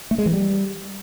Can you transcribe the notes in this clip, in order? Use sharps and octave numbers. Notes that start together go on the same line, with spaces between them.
A3
G#3
E3
G3